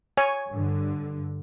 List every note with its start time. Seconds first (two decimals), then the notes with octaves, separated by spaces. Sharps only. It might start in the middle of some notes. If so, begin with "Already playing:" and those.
0.17 C#5 G#5
0.49 G2 D3